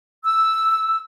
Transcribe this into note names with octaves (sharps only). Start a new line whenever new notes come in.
E6